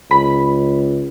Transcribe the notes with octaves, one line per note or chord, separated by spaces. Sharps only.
C#2 B5